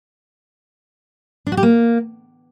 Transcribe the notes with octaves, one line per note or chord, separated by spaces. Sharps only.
D4
F#4
G4
A#3